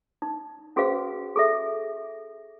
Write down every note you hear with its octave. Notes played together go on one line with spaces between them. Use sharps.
D#4
C#4 F#4 G#4 B4 C5 F5
G#4 A4 E5